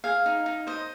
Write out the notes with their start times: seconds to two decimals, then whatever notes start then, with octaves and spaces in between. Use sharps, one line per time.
0.04 G#4 F5
0.26 D#4
0.46 D#4
0.67 C5 D#5